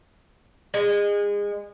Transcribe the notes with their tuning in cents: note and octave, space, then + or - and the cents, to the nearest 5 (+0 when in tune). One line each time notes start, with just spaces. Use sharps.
G#3 -25